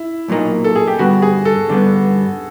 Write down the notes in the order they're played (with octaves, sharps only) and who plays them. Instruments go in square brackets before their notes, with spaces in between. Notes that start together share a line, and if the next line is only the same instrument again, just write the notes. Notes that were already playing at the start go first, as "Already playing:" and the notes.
Already playing: [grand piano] E4
[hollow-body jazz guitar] B1 A#2 F#3 A#3 D#4
[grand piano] A4
G#4
G4
[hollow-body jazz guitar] G2 D3 G3 B3 [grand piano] F#4
[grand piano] G#4
A4
[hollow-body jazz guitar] G2 D3 G3 B3